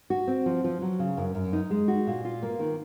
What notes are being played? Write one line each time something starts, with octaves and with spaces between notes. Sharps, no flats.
F#4
C4
F3
F3
F#3
C#3
F#2
F#2
D#4
G#3
F#4
A#2
F4
A#3
D#3